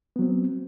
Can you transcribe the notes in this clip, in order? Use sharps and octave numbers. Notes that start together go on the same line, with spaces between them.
F#3 B3 C4